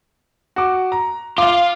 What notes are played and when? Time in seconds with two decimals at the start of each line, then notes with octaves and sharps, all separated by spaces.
0.56 F#4 D6
0.92 A#5
1.38 F4 F5 D6